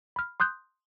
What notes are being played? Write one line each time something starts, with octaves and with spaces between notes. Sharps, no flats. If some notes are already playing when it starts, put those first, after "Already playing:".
B5 F6
C6 D#6 F#6 G6